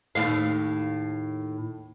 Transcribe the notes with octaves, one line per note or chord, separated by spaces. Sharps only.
D#2 A2 F5